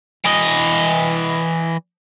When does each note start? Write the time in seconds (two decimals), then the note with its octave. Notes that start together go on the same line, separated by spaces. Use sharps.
0.25 E3 D#5